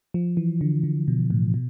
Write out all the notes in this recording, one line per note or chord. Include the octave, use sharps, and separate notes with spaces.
F3
E3
D3
D3
B2
A2
B2